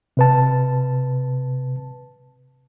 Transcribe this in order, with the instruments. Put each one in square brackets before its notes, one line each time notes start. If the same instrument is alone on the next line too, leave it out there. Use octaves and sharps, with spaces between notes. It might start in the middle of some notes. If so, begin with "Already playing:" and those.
[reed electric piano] C3 B4 A5